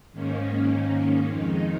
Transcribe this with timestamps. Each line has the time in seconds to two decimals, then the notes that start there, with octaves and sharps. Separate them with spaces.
0.13 G#2 D#3 A#3 C#4
1.26 F2 D#3 G#3 D#4